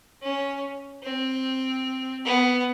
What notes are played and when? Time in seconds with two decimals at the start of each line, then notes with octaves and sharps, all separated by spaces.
0.22 C#4
1.03 C4
2.25 B3